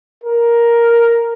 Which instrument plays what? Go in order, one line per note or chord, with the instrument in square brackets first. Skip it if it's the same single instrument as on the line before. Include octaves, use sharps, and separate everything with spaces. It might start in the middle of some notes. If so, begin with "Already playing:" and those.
[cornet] A#4